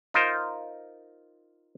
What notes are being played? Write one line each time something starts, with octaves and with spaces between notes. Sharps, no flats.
D#4 F4 A#4 C5